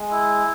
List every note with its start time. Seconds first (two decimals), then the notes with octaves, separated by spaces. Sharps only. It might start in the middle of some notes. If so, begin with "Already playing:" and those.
Already playing: G#3
0.11 E4